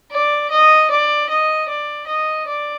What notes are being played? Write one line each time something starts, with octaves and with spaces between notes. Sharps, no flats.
D5
D#5
D5
D#5
D5
D#5
D5